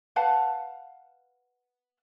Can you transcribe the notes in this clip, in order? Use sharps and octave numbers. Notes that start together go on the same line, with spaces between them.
B4 F5 F#5 A5